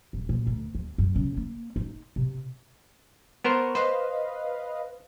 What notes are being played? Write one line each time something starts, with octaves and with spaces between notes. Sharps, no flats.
D#1
A#2
D2
D#2
F#2
C#3
A#3
D#4
C3
B3 A#4 C5 C#6
B4 C5 D#5 F5